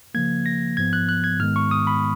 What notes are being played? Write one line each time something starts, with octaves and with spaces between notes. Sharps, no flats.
C#3 F3 A#3 G#6
A#6
G#2 F3 B3 G#6
F#6
F#6
G#6
G#2 D#3 G#3 B3 F6
C#6
D#6
B5